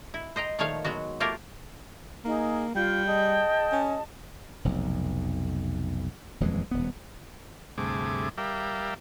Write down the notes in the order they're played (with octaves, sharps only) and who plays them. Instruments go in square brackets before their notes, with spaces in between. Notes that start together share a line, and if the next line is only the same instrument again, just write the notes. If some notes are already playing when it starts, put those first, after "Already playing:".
[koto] E4
C5 D#5 G5 A#5
A#2 D#3 F3 A3 C#5 F5
F#3 G#3 B3 F#4
A3 A#3 F4 G4 A#4
[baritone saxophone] A#3 [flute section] D#4 G#4
[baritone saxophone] G3 [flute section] F4 D5 F5 [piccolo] G5
[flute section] G#4 D#5 A5
[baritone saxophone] C#4
[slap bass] F1 B1
D#1 F2 E3 G#3
D#1 B3
[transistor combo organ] D2 G2 C3 A3 G#4 D6
G3 A#4 D5 E5 F5 G5